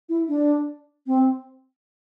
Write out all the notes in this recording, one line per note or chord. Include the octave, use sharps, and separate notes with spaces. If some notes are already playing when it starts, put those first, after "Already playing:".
E4
D4
C4